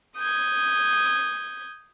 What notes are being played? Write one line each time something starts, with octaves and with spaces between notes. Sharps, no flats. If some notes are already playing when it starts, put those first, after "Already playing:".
D#6 G6 G#6